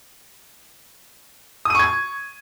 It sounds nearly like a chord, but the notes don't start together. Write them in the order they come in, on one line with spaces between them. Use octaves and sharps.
D#6 D#7 C#6 G#6